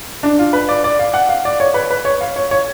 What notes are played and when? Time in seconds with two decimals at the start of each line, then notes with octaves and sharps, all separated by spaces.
0.23 D4
0.39 F4
0.53 B4
0.69 D5
0.84 D5
0.99 F5
1.14 F#5
1.29 F5
1.45 D5
1.60 C#5
1.74 B4
1.91 B4
2.05 C#5
2.21 F5
2.36 C#5
2.51 C#5